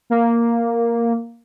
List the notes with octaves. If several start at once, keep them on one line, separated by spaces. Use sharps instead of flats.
A#3